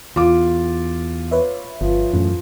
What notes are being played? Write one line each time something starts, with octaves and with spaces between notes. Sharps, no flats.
E2 F4 D6
B4 C#5 E5
G1 F3
F#2 A2 E3